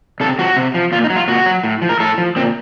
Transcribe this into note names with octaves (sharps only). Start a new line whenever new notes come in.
C3 A4
F3 F#4
C3
F3
A#2 F4
D#4
F#3
F4
A#2 F#4
F#3
A2
F3
A#4
A2 A4
F3
A#2 C4